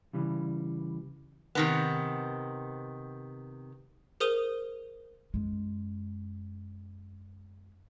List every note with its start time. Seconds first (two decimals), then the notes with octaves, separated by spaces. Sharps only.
0.13 C#3 E3 G3
1.55 C3 D#3 B3
4.20 G#4 A#4 C5 D#6 D#7 G7
5.34 F#2 G#3